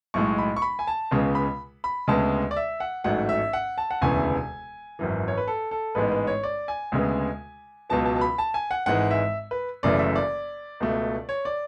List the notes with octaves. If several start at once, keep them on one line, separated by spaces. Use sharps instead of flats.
B1 A2 G#3 C#6
B5
C#6
B5
G#5
A5
C#2 C#3 G#3 B3
B5
B5
D2 C#3 G#3 B3 A5
D5
E5
F#5
A1 G#2 F#3 A3 F#5
E5
F#5
A5
F#5
E1 D2 C#3 E3 B3 G#5
G#1 F#2 E3
C#5
B4
A4
A4
A1 G#2 G#3 B3 B4
B4
C#5
D5
G#5
D2 C#3 G#3 B3
C#2 B2 F#3 B3 A5
A5
A5
B5
A5
G#5
F#5
G#1 G#2 E3 G#3 F#5
E5
B4
F#1 F#2 C#3 E3 A3 D5
E5
D5
C#2 B2 A3
C#5
D5